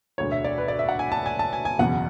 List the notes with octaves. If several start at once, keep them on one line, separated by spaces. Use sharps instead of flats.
E1 D2 D3 C#5
E5
D5
B4
D5
E5
F#5
G#5
A5
G#5
A5
G#5
G#5
F#1 E2 B2 F#5